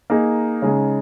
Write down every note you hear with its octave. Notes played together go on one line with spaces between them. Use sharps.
A#3 D#4 G#4
C#3 G#3 D#4 G#4